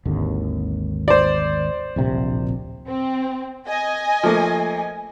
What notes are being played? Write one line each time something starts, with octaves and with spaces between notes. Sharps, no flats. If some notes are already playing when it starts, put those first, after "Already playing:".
G#1 D#2 D3
C5 D5
D1 A#1 C3
C4
D#5 G#5
F3 A3 A#3